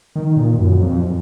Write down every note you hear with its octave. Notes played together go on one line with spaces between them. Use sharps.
D#3
A#2
F#2
F2